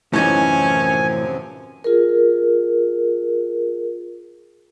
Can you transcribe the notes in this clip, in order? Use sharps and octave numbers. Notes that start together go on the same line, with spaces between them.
F#2 A2 C3 E3 F3 C#4 D#4 G#5
F4 G#4 A#4